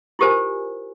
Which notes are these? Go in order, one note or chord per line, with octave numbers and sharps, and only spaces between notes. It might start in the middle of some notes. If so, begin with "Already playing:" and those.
E4 F4 G4 A#4 C5 G#5